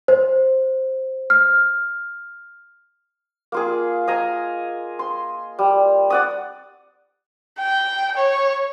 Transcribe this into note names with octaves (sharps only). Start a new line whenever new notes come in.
C5
F6
A#3 F4 G#4
D#5 G#5 A#5
C6
G3
D5 F#5 D#6
G5
C#5